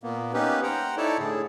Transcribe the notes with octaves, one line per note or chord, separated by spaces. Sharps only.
A#2 A#3 B3
A#3 B3 C#4 D#4 G4 B4
C5 F#5 G5 A#5
D#4 E4 A4 C#5 D5 A5
A2 D3 G#4